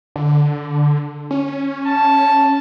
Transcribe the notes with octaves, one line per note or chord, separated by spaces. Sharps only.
D3
C#4
A5